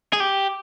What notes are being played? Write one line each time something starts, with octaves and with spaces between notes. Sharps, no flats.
G#4
G4